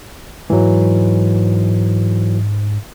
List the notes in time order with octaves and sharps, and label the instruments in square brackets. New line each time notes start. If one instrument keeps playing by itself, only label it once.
[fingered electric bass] G#2 G#3 [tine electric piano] E3 F#3